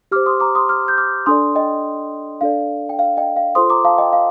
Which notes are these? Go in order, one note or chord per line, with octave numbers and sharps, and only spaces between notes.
G4 C5 D6 F6
C6 D#6
A#5 D6
C6 D#6
D6 F6
G6
D6 F6
D4 A4 D5 C6 D#6
D#5 G5
D4 A4 D5 F5
G5
F5
D#5 G5
F5
F4 A4 C5 C6 D#6
A#5 D6
F5 A5
D#5 G5
F5